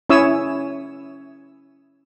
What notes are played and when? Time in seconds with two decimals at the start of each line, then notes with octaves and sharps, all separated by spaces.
0.10 C#4 E4 C#5 D#6 E6